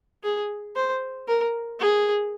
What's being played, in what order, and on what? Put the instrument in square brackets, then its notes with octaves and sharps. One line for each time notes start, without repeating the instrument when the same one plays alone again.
[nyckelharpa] G#4
C5
A#4
G#4